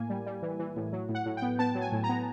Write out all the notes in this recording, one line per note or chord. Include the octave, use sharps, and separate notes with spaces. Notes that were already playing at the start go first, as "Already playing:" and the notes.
Already playing: A2 A#3 G#5
G3
G3
E3
E3
A2
F#3
A2
F#5
A2
G5
B3
B3 A5
F#3
G#5
A2
A#5
B3